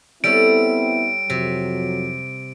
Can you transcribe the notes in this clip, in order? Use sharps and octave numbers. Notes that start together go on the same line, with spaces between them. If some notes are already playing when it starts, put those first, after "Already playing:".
G3 B3 C4 E4 A4 C#5 D7
F2 C3 F#3